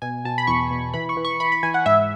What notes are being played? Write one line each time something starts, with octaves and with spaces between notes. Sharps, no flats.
B2 G#5
B2 A5
B5
E2 C#6
B2
E3 B5
C#6
E3
C#6
E3 B5
B5
E3 G#5
F#5
G#2 E5